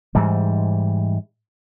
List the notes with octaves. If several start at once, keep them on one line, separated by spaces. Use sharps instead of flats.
G#2 E3 G3